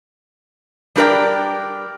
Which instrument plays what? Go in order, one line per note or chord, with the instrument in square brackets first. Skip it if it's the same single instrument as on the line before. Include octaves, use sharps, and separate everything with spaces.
[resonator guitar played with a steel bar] G3 D4 G4 A#4 D5 G5